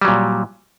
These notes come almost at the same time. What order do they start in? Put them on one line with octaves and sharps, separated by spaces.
G3 F#3 A#2